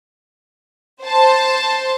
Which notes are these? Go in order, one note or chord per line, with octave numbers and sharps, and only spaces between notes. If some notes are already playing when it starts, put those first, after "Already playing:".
C5 A5